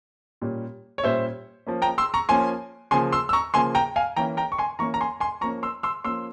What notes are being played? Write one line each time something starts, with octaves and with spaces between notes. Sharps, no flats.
A#2 G3 C#4
C#5
A#2 G3 C#4 C5 E5
F3 A#3 C#4
G5 A#5
C6 E6
A#5 C#6
F3 A#3 C#4 G#5 C6
C#3 F3 A#3 G#5 C6
C6 E6
E6
A#5 C#6
C#3 F3 A#3 G#5 C6
G5 A#5
F5 G#5
E3 A#3 C#4 G5 A#5
G5 A#5
C#6
G#5 C6
E3 A#3 C#4 A#5 C#6
A#5
G#5 C6
G#5 C6
F3 A#3 C#4 A#5 C#6
C6 E6
C6 E6
F3 A#3 C#4 C6 E6